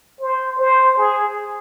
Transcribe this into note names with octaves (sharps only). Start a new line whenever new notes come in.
C5
C5
G#4